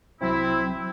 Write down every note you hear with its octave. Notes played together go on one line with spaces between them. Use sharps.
C2 F#3 C4 E4 G5